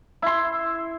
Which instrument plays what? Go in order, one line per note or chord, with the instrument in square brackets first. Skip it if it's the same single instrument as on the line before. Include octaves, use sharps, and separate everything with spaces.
[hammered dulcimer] E4 C6